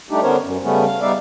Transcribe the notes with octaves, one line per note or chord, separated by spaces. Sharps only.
G3 A3 D4 D#4 G4
D3 B3 C#4 A#4 C5 C#5
F#2
C#3 G3 A3 B3 C#4
F5
G3 B3 D#4 D5 E5 F5